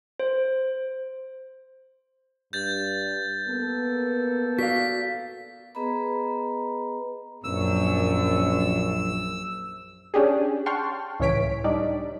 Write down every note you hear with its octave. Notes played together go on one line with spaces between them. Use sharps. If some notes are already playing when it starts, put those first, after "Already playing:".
C5
G2 G6 A6
A#3 B3 A4 A#4
F#4 D5 F5 B6
B3 G#4 B4 D#5 A#5 B5
A#1 F#2 E6
C#4 D4 G4 G#4
F#5 G5 A5 C6 C#6 F6
C#2 A2 E3 C#5 B6 D7
G3 D4 D#4 D5